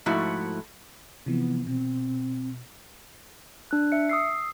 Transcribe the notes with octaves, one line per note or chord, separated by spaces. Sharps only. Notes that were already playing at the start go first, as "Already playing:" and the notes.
G#2 F3 A3 E4 F#4
C3 E3 F3 B3
B2 C4
D4 F#6
E5 C#7
D#6 E6 C7